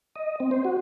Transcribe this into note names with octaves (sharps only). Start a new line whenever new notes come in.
D#5
C4
C5
F#4